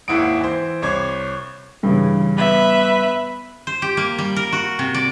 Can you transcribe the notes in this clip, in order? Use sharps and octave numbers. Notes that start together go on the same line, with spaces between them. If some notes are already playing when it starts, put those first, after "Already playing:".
G#1 D#2 E4 F#5 D#6 D7
E3 C5
C2 C5 C#5 D6 G#6
G2 C#3 E3
B3 B4 E5
C5
G4
A#3
G3
A#4
F#4
C3
D5